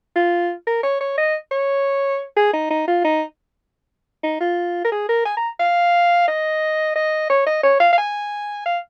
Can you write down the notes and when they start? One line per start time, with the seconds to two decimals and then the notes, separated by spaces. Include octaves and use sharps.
0.16 F4
0.67 A#4
0.83 C#5
1.01 C#5
1.18 D#5
1.51 C#5
2.37 G#4
2.53 D#4
2.71 D#4
2.88 F4
3.04 D#4
4.23 D#4
4.41 F4
4.85 A#4
4.92 G#4
5.09 A#4
5.25 G#5
5.37 A#5
5.60 F5
6.28 D#5
6.96 D#5
7.30 C#5
7.47 D#5
7.63 C#5
7.80 F5
7.93 F5
7.98 G#5
8.66 F5